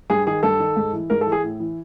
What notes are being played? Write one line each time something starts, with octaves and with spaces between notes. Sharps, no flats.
G2 G#4
D#3 G#4
G2 A4
D#3
G#2
E3
G#2 A#4
A4
E3
G#4
A2
E3